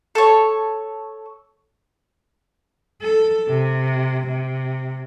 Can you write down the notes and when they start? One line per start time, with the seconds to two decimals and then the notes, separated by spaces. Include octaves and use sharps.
0.15 A4 C#5
3.02 A4
3.49 C3
4.27 C3